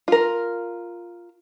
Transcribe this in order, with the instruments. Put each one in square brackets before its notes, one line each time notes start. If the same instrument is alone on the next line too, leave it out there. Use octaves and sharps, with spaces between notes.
[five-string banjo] F4 A#4